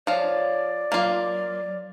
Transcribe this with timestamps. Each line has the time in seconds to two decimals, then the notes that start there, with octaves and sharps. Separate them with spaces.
0.07 F3 F4 C#5 D5
0.92 F#3 A#3 F4